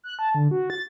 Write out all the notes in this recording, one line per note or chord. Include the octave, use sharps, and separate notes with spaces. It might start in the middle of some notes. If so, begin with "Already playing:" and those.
F#6
A5
D3
F#4
A6